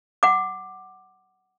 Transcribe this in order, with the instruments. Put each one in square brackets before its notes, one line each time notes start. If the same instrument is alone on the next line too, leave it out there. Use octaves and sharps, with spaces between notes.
[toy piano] F#5 D6